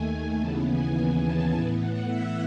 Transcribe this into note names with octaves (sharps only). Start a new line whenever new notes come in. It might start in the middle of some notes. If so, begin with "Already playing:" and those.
Already playing: D#2 D#3 A3 G#5
D#2 C#3 E3 B3 A5
G#5
G#5
A5
A2 E3 B3 G#5
F#5
E5